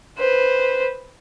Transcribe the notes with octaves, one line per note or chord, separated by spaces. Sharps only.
B4 C5